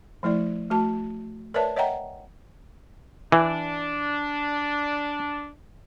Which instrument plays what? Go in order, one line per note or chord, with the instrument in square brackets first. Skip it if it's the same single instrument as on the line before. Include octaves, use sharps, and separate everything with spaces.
[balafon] F3 A3 E4 D5
A3 F#4 A5
A#4 B4 C#5 D5 E5 A5
C#5 D#5 E5 F#5 G5 A#5
[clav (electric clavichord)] E3 [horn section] D4